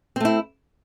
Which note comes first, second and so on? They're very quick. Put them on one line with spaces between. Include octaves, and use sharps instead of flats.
C4 A3 E4